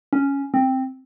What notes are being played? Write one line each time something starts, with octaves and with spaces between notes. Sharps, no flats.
C#4
C4